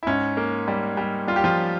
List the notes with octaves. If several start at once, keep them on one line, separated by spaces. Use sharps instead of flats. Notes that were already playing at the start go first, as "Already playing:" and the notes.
E4
G#2 C#4
A#3
G3
G3
G3 F4
G4
F3 F4